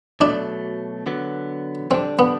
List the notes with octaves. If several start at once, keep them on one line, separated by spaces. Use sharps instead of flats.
B2 F#3 A3 D4
D3 F#3 B3
D3 G3 C4 D4
B3